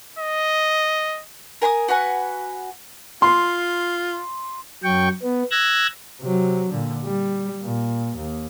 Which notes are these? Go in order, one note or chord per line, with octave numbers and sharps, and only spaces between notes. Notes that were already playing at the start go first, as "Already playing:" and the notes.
D#5
A#4 G#5 B5 D#6
F#4 B4 F#5 G#5
F4 C6
F#2 F#3 G5 C#6
B3
E6 F#6 G#6 A#6
C3 F#3
A#2 D3
G3
A#2
D#2